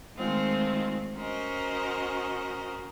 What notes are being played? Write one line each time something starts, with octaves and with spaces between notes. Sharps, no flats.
D#3 G#3 A3 C4 F4
C#4 F#4 A#4 C5 D#5